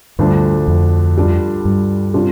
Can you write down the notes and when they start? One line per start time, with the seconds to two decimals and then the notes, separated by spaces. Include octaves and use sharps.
0.19 D2 G2 D3 F3 A3 D4
0.68 F2
1.17 G2 G3 D4 F4
1.65 G2
2.14 C3 G3 D4 F4